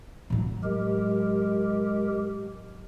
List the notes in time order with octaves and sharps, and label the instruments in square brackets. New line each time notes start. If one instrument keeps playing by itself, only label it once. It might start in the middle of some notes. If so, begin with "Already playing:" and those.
[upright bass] A2 F#3
[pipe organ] G#3 G4 A#4